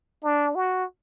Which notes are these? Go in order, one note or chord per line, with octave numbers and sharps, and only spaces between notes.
D4
F#4